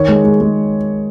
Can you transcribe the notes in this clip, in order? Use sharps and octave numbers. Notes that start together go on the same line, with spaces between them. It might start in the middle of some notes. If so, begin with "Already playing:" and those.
Already playing: D#3 C#5
G#3
G#3
G#3